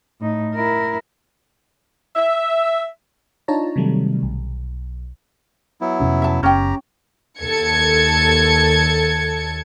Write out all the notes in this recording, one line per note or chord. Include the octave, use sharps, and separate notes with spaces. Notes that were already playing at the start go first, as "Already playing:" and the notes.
A2 D#4
E4 A#4
E5
D4 D#4 F4 C#5 A5 A#5
C3 D#3 F#3 G3 A3
B1
F#3 B3 E4
F2 C3 C#4
E5 A5
F#1 B3 C#4 G4 G5 A#5
D#2 A4 G#6 C#7